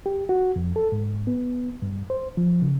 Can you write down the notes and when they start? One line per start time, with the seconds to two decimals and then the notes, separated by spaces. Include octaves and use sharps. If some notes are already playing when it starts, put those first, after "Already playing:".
0.06 G4
0.29 F#4
0.56 F2
0.76 A4
0.92 G#2
1.27 B3
1.82 G2
2.10 C5
2.37 F3
2.62 C#3